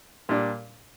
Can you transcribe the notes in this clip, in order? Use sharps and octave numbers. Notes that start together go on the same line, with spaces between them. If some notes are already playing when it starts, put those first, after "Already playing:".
A#2 G3 D4